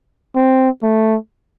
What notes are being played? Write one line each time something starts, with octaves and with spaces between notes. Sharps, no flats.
C4
A3